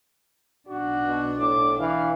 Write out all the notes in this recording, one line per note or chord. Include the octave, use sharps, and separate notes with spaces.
B1 D4 F#4
B2
A2 D6
E3 F5